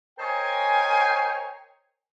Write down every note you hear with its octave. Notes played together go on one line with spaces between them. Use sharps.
A#4 C5 C#5 D#5 G5 G#5